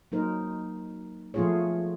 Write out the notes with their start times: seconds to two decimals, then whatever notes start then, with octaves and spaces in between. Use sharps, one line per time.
0.12 F#3 A#3 D#4 A#4 C5
1.34 F3 A3 B3 F4 G#4 C#5